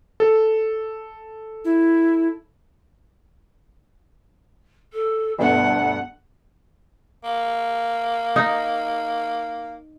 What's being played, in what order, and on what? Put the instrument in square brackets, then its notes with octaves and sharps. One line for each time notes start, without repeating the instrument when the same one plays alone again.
[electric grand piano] A4
[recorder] E4
[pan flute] A4
[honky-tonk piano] G1 D2 B2 [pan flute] D4 [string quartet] F#5
[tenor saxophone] A#3
[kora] D#4